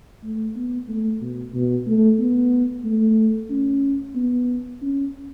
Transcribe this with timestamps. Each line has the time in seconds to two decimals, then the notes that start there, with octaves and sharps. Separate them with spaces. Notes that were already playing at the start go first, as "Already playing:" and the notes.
0.24 A3
0.56 B3
0.88 A3
1.21 B2
1.54 B2
1.87 A3
2.19 B3
2.84 A3
3.50 C#4
4.15 B3
4.82 C#4